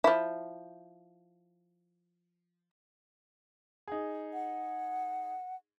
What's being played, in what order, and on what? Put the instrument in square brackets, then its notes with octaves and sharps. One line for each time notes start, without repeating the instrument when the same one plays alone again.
[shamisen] F3 E4
[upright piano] D#4 G#4
[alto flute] F#5